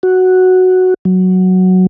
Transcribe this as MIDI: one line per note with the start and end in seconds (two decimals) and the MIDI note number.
0.03 0.94 66
1.05 1.86 54